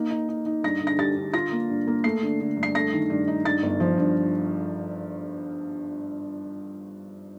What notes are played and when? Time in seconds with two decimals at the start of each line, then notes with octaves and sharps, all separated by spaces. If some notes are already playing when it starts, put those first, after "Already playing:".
Already playing: A#3 D#4
0.10 D#4
0.28 D#4
0.46 D#4
0.63 G2 A#6
0.81 D3
0.87 A#6
0.99 G3 A6
1.17 D3
1.34 F4 A#6
1.52 A#3
1.70 G2
1.87 A#3
2.04 A3 C7
2.23 D3
2.40 D3
2.57 G2
2.63 C7
2.75 A3 A#6
2.93 D#3
3.10 G2
3.28 D#4
3.45 G2 A6
3.63 G1
3.80 F3
3.98 G2